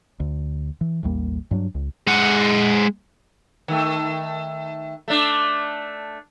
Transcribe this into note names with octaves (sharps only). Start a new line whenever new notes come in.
D2
E3
A1 D#2 G3 A#3
G2 F#3 C#4 D4
C#2
G#3 F#5
D#3 A3
A3 D4